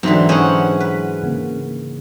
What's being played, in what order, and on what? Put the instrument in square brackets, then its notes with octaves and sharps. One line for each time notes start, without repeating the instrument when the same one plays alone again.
[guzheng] G#2 D3 [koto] E3 C4 [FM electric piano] F#3
[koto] C#4 F#5 [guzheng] G#4 C5
[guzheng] B4
[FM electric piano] C#3 A#3